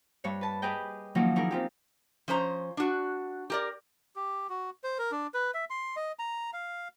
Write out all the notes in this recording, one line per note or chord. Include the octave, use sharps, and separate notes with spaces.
G2 C#5
B4 A5
G4 G#4 B4 D#5 G5
D#3 F3 F#3 A#3 C#4 D#4
C#4 D#4 E4 G#4 A#4
C4 F4 G4
F3 C#4 C5 A#5
D4 F#4
G4 A#4 D5
G4
F#4
C5
A#4
D4
B4
E5
C6
D#5
A#5
F5